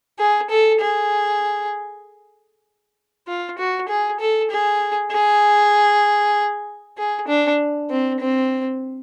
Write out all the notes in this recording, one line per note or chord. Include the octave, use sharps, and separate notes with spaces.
G#4
A4
G#4
F4
F#4
G#4
A4
G#4
G#4
G#4
D4
C4
C4